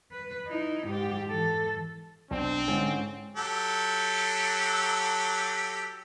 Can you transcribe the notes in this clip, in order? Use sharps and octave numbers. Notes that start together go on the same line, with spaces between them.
B4
D#4 E4
G#2 G4
E3 A4
B1 C4 D4
G#2 D3 C#4
F#3 G4 A4